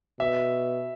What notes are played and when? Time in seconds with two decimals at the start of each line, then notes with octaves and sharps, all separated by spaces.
0.20 B2 E5